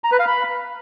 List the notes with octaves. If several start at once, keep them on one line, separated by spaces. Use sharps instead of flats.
A#5
B4
F5
B5